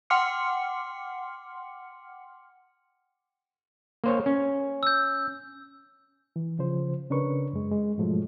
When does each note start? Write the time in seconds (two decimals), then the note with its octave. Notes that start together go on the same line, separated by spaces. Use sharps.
0.10 F#5 G5 C6 D6 F6 C#7
4.04 A#3 C5 C#5
4.26 C#4
4.83 E6 G6
6.36 E3
6.59 C#3 F3 C5
7.10 C#3 C#4 D4 A#4 B4 C#6
7.53 F#2 G#3
7.72 G#3
7.98 G#2 B2 F3 F#3 G#3 A3